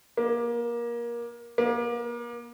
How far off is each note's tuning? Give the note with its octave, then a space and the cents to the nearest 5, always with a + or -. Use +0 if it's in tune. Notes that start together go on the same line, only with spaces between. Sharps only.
A#3 +25
A#3 +35